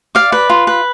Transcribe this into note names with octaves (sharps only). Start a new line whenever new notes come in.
D5 F5
B4
F4
B4